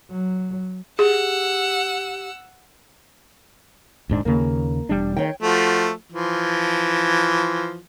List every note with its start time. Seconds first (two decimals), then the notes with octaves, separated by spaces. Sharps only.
0.11 F#3
0.99 G4 G#4 F#5 E6
4.09 D#1 G#2 D4
4.25 D#2 C#3 A#3
4.89 E1 G3 D4
5.16 D#3 C#5 G5
5.41 F3 A3 F#4
6.12 E3 F3